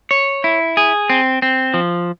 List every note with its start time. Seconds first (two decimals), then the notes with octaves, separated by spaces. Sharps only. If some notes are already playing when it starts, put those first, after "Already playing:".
0.11 C#5
0.44 E4
0.77 G#4
1.10 C4
1.42 C4
1.74 F3